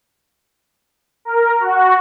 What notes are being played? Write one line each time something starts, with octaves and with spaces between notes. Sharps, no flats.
A#4
F#4